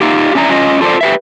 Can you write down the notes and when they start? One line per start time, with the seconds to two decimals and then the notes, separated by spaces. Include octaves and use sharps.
0.01 D#4 F4 G4
0.35 C#4 D4 E4 A5 A#5
0.50 C#4 F4 D#5
0.81 F4 A4 B4 C5 D5
1.01 G4 B4 E5